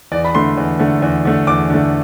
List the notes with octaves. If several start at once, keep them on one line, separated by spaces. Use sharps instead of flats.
E2 D5
B5
D3 A3 C6
E2
D3 A3
E2
D3 A3
E2 D6
D3 A3